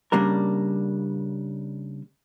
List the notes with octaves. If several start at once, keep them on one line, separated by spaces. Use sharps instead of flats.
C#3 G3 A#3 D4 A#4